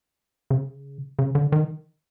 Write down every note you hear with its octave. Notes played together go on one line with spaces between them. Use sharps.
C#3
C#3
D3
D#3